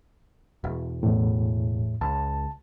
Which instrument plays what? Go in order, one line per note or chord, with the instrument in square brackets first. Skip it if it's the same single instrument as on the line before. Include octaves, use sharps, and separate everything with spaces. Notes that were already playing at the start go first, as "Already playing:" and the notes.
[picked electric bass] E1
[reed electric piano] E2 A2
[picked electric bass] C#2 [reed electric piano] A5